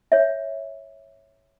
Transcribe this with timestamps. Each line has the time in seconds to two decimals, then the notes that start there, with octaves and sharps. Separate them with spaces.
0.12 C#5 E5